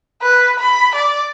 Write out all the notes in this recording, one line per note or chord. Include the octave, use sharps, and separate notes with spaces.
B4
B5
D5